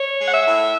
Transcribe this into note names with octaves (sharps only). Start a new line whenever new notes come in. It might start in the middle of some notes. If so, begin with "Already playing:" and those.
Already playing: C#5
G#3
F#5
E5
A2